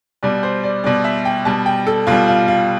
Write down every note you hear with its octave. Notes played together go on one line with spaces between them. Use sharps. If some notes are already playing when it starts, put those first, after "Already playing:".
B2 G3 D5
C5
D5
B2 G3 D5
E5
G5
B2 G3 A5
G5
A4
B2 G3 F4
F4
F4